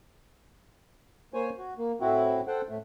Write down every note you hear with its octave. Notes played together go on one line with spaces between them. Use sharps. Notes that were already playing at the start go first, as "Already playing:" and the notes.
A#3 C5 C#5 G#5
F#4
A#3
A2 C4 E4 F#4
A4 C5 F#5 G5
A2 A3